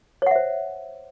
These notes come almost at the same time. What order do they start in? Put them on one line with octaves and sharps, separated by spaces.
C#5 F#5 E5 C5